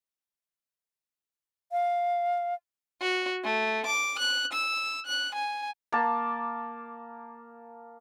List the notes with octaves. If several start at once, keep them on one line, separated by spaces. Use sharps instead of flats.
F5
F#4
A3
D6
F#6
E6
F#6
G#5
A#3 A5